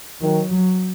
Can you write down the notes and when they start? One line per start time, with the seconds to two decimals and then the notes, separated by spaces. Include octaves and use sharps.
0.22 D#3 F#3
0.51 F#3